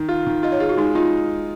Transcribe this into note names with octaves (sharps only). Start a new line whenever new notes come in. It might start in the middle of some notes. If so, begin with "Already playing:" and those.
Already playing: D#3
F4
D#3
F4 D#5
C#5
F4 G#4
F#4
G#3 D#4
D#4 F4